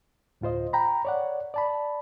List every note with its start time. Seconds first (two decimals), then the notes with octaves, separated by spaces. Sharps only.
0.41 D2 A2 F4 C5 D#5
0.73 G5 A#5 B5
1.05 C#5 D5 F#5
1.54 D5 A5 B5